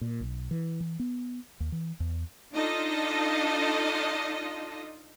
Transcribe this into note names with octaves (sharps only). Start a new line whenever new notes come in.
A#2
B1
E3
E3
B3
D#2
E3
E2
D4 D#4 F4 A4 D#5